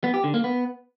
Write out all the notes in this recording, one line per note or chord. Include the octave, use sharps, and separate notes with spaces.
B3
G4
D3
A#3
B3